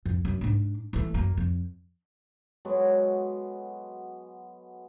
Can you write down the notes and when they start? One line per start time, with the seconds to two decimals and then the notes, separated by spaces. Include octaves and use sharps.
0.06 F2
0.25 F#2
0.41 G#2 D4
0.93 E3 A3
1.14 F#2 A#3
1.38 F2
2.65 F#3 G#3 B3 A4